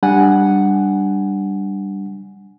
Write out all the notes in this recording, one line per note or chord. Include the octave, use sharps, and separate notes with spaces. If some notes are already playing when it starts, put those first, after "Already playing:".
G3 D4 F#5 G#5